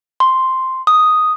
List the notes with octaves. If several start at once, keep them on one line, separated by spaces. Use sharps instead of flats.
C6
D#6